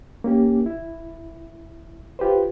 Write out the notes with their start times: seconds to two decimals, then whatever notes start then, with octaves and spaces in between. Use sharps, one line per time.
0.24 A#3 C#4 G4
0.66 E4
2.19 F4 G4 B4 C5